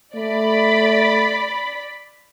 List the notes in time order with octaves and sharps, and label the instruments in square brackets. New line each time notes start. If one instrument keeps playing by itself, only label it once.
[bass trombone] A3 [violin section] D5 B5